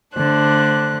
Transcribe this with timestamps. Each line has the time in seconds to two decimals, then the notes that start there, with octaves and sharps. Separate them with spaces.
0.14 D3 A3 D4 C5 F#6